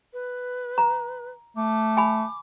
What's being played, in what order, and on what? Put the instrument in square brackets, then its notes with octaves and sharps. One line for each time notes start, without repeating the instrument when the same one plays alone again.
[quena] B4
[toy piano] A#5
[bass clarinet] A3 [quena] D6
[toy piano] G#5 B5